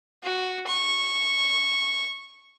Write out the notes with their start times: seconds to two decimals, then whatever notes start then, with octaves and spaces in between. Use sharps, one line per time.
0.23 F#4
0.67 C#6